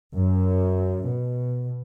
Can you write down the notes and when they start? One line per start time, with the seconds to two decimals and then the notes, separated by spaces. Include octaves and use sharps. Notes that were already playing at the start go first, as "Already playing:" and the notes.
0.15 F#2
1.06 B2